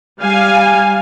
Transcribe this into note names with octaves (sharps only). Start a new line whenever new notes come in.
G3 F5 G#5